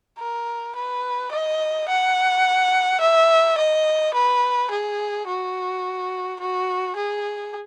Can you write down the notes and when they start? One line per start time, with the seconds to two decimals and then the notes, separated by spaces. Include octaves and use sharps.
0.19 A#4
0.75 B4
1.32 D#5
1.88 F#5
3.01 E5
3.58 D#5
4.14 B4
4.70 G#4
5.27 F#4
6.40 F#4
6.96 G#4